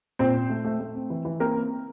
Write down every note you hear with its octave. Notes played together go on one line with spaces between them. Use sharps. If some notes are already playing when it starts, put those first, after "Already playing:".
A#2 C4 C5
C4
A3
A3
A3
C4
E3
E3
A#3 C4 A#4
C4